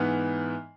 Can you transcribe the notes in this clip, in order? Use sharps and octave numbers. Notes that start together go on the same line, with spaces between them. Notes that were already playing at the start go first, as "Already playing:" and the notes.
Already playing: G#2 E3 B3 F6